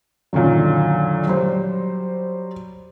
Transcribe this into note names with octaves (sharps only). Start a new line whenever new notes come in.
F#2 A#2 D3 D#3 F#3
F#3 G3 C5